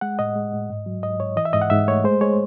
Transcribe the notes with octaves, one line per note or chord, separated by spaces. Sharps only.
G#3 F#5
A2 D#5
G#3
A2
G#2
F#3
G#2 D#5
G#2 C#5
E3 D#5
E5
G#2 D#5
F#5
G#2 E5
A3 C#5
G#3 C5
G#3 C#5